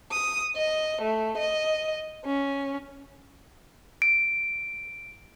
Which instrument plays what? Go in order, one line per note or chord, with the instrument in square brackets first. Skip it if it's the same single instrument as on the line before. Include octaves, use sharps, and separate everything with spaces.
[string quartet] D#6
D#5
A3
D#5
C#4
[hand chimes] D7